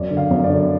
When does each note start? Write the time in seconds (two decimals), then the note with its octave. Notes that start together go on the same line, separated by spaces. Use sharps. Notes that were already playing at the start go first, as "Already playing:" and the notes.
Already playing: F#2 D5
0.11 D3
0.17 F5
0.31 F#2
0.44 D5
0.50 D3